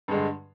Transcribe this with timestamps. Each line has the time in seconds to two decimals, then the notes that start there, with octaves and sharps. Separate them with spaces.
0.08 G2
0.11 G#3
0.14 D3